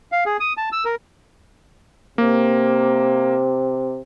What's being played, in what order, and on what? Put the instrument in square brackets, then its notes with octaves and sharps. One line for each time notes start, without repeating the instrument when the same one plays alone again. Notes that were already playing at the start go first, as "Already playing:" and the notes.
[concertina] F5
G#4
D#6
A5
E6
A#4
[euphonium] C3 [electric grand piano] A#3